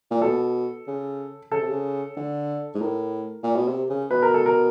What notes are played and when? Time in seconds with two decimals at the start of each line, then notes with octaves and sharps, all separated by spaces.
0.11 A#2
0.22 B2 A4
0.87 C#3
1.51 C#3 A4
1.61 C3
1.70 C#3
2.16 D3
2.75 G#2
2.81 A2 A#4
3.43 A#2
3.56 B2
3.68 C3
3.89 C#3
4.11 B2 B4
4.22 A#4
4.34 A4
4.46 A#4